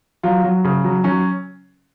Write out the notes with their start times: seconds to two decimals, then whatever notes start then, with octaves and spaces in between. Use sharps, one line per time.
0.23 F#3 F4
0.44 F#3
0.65 C#3
0.84 F#3
1.04 F#3 C#4